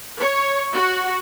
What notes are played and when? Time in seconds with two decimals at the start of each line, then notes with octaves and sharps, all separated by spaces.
0.19 C#5
0.73 F#4